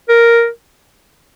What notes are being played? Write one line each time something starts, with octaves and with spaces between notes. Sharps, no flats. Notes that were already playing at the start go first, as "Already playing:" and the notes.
A#4